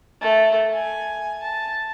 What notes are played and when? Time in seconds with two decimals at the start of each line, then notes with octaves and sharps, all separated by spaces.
0.22 A3
0.73 G#5
1.43 A5